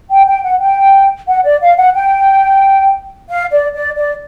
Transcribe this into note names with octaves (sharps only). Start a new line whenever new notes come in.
G5
G5
F#5
G5
F#5
D5
F5
F#5
G5
F5
D5
D5
D5